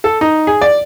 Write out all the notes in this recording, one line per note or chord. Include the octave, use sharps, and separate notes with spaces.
A4
D#4
G#4
D5